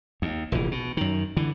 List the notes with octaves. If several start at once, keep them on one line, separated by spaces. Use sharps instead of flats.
D#2
F1 A#1 E3
B2
F#2 D#3
D3 E3